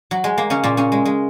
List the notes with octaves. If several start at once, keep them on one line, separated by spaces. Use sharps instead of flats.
F#3
G#3
A#3
C#3 C#4
A#2 A#3
C#3 C#4
G#3
G#3